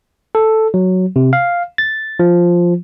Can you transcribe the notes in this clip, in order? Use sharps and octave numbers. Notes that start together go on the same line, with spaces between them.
A4
F#3
C3
F5
A6
F3